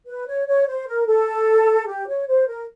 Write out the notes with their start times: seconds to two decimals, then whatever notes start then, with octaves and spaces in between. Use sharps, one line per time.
0.07 B4
0.27 C#5
0.47 C#5
0.68 C5
0.88 A#4
1.07 A4
1.87 G4
2.08 C#5
2.28 C5
2.47 A#4